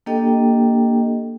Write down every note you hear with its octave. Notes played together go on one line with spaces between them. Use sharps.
A#3 D4 G4 A4 D#5 G5